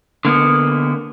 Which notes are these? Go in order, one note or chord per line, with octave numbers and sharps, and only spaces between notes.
D3 A#3 B3